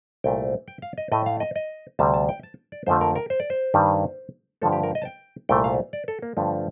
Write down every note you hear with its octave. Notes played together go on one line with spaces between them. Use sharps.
C2 A#2 A3 G5
G5
F5
D#5
A2 A3 D#5
F5
D#5
D#5
D2 C3 G3 A5
A5
G5
A5
D5
F2 D3 F3 A3 C5
A#4
A#4
C5
D5
C5
G2 D#3 G3
G2 D3 F3 A3 A4
G4
A#4
D#5
A5
G5
C2 A#2 A3 G5
F5
D5
A4
A#3
G2 D3 F3 A3